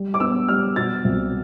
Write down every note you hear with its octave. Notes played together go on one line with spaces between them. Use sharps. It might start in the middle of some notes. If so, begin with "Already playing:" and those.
Already playing: G3
D6
B3 E6
G3 F6
B2 A6
C2